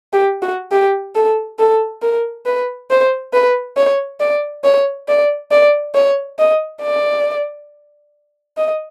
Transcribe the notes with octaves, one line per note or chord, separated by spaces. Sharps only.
G4
F#4
G4
A4
A4
A#4
B4
C5
B4
C#5
D5
C#5
D5
D5
C#5
D#5
D5
D#5